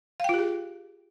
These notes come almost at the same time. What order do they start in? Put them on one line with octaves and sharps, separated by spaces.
F5 G5 F4 G4 G#4